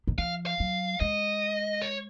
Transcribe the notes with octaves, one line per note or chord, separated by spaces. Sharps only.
D#3
F3 F5
F5
F#3
G#3 D#5
C#5